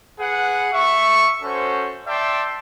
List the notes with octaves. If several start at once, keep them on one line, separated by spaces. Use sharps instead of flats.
G#4 B4 F#5
E5 C#6
C#4 F#4 A4 C5
D5 E5 G5 A5 C6